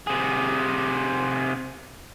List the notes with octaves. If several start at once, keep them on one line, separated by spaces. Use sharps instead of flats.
C3 G#4